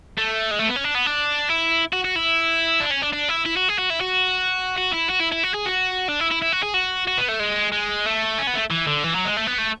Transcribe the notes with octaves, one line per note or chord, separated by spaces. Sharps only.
A3
G#3
A3
B3
C#4
D4
B3
D4
E4
F#4
F#4
E4
D4
C#4
D4
D4
E4
E4
F#4
G#4
F#4
E4
F#4
F#4
E4
F#4
E4
E4
F#4
G#4
F#4
D4
E4
E4
E4
F#4
G#4
F#4
F#4
B3
A3
G#3
G#3
A3
C#4
B3
A3
E3
D3
E3
F#3
G#3
A3
B3
A3